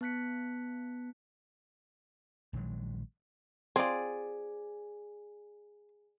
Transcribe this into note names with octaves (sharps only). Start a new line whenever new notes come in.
B3 A5 F#6 B6 C#7
A#1 D#3 F#3 G#3
C4 F4 G#4 D5